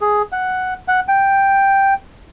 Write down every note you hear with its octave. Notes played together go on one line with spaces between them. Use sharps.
G#4
F#5
F#5
G5